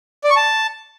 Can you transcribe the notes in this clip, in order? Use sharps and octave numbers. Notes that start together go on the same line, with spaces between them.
D5
C#6
A5